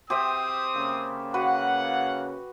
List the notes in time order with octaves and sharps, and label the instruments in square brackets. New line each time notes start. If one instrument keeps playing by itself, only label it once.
[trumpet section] C4 D#6 [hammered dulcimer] G4 C5 E5
[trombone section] C#3 A#3
[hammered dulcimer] F#4 B4 [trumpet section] F#5